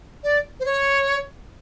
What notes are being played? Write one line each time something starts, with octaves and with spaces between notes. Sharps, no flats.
D5
C5
C#5